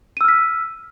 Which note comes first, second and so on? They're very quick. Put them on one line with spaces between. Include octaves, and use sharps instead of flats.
D#7 E6 F6 B6